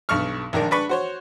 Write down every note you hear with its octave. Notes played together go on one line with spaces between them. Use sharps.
B1 G2 C#6 F6
A#1 D#3 D4 A#4
D4 B4 B5 C#6
F#4 C5 C#5